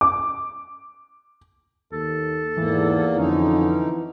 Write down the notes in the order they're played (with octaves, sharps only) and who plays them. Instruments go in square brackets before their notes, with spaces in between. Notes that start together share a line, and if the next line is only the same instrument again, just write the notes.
[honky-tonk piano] D6
[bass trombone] D#2 [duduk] A4
[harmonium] E2 A#3 [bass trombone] G#2 [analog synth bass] E3
[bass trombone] F2 [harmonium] D3 D#4 [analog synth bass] E3 [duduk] C#4